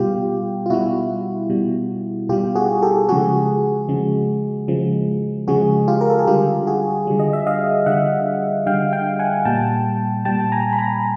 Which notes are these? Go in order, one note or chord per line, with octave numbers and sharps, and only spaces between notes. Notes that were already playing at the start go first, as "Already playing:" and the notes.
Already playing: B2 G3 F4 G4
F4
B2 G3 E4 F#4
B2 G3
B2 G3 F4 G4
F#4 G#4
G4 A4
C#3 F3 G#3 F#4 G#4
C#3 F3 G#3
C#3 F3 G#3
C#3 F3 G#3 F#4 G#4
F4 G4
A#4
A4
G#4
D3 G3 F4 G4
F#4 G#4
D3 G3
D#5
E5
D#5 F5
D3 G3 E5 F#5
D3 G3 F5 G5
F5 G5
F#5 G#5
A#2 G3 G5 A5
A#2 G3 G5 A5
G#5 A#5
B5
G#5 A#5